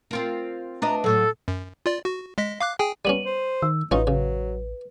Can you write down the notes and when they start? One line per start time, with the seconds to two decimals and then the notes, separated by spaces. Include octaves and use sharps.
0.11 C4 F4 A#4
0.82 D4 B4 D#5 A#5
1.04 A2 F#3 A4
1.48 F#2
1.86 F4 D5
2.05 F#4
2.38 G#3 D#5 B6
2.60 F5 D6 F#6
2.79 G#4 G5 G#5
3.05 G3 B3 C#4 D#7 F#7
3.25 C5
3.62 D#3 E6
3.91 A1 C#4 D#4 F4 F#4 B4
4.07 C#3 F#3